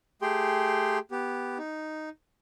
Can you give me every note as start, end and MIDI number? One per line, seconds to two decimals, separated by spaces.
0.22 0.99 57
0.22 0.99 67
0.22 0.99 68
0.22 0.99 79
0.22 0.99 84
1.11 1.58 59
1.11 1.58 67
1.58 2.09 63